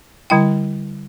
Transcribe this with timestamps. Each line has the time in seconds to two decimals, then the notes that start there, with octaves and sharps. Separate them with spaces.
0.30 D3 G3 E4 G5